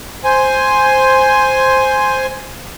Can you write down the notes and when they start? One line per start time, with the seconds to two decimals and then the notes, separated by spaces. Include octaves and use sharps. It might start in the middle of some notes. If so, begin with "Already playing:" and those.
0.24 C5 G#5